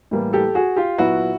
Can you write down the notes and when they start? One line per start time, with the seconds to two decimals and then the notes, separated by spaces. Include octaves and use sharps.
0.11 A2 E3 G3 A#3
0.33 G4 A4
0.55 F#4 G#4
0.76 F4 G4
0.98 A#2 F#3 B3 E4 F#4